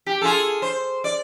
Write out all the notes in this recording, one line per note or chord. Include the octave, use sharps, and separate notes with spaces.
G4
F4 G#4 A4
C5
D5